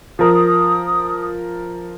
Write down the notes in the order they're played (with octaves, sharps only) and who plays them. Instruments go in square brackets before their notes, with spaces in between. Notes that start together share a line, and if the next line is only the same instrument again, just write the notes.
[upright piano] F3 A#4 [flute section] D#6